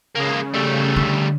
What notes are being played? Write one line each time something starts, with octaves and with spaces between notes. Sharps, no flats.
C#3 G#3 A#3
G3 A3
D3